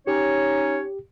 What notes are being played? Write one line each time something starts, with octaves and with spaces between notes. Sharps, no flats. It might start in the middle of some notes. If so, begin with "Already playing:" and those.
C#4 D#4 G4 C#5